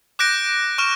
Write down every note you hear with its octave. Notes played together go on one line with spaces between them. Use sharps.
D6 F#6 G6 A#6 D7
C#6 F6 E7